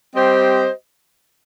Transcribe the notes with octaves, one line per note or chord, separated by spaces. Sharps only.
G3 C4 G4 C5 D#5